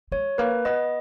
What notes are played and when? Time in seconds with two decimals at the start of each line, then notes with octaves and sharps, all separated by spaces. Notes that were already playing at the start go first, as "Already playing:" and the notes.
0.12 G#3 C#5
0.38 A#3 B4
0.65 B3 D#5